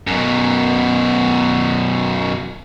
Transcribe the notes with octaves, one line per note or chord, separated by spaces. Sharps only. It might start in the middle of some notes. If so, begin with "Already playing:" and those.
F#2 B2